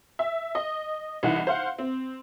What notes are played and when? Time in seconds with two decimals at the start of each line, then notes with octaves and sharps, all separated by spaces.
0.19 E5
0.55 D#5
1.23 C2 E3 D#4 F#5
1.47 C5 F5 F#5
1.78 C4